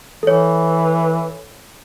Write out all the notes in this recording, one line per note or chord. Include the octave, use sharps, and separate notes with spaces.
E3 A4 C#5